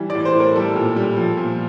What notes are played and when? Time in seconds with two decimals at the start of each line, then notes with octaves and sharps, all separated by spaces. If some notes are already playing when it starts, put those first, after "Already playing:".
Already playing: E3 G3
0.10 D5
0.15 A2
0.25 C5
0.35 A2
0.40 A#4
0.56 G3 A4
0.76 A#2
0.96 G3
1.17 F3
1.37 A#2